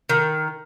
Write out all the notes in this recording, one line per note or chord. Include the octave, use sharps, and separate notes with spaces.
D#3